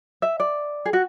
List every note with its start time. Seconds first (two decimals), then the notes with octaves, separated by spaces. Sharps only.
0.22 E5
0.40 D5
0.85 G#4
0.93 F#4